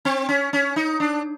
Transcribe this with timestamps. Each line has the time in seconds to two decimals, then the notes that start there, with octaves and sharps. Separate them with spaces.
0.05 C4
0.29 C#4
0.53 C#4
0.76 D#4
1.00 D4